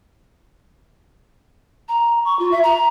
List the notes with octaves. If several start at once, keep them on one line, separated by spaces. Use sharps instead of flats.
A#5
C#6
F4
E5
A#5